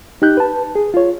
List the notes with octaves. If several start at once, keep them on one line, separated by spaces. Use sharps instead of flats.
D#4 G4 F#6 G6
B4 A5
G#4
F4 C#5